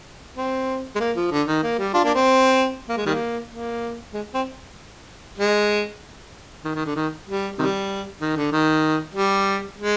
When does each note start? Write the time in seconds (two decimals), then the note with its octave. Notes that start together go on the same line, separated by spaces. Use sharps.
0.37 C4
0.96 G#3
1.00 A#3
1.16 F3
1.31 D3
1.47 D#3
1.63 A#3
1.78 G3
1.94 D4 F4
2.04 A#3 D4
2.15 C4
2.89 A#3
2.97 G#3
3.06 D#3 G3 A#3
3.51 A#3
4.14 G#3
4.34 C4
5.38 G#3
6.65 D#3
6.75 D#3
6.86 D3
6.96 D#3
7.27 G3
7.59 C3 D#3 G3
8.21 D#3
8.37 D3
8.52 D#3
9.15 G3
9.78 G#3